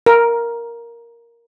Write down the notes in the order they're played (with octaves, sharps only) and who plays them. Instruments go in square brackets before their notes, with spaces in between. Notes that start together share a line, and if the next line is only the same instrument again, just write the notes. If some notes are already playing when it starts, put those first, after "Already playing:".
[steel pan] A#4